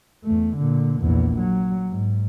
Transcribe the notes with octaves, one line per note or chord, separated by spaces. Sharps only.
E2 A3
A#2 D3
A#1 E2
F#3
G#2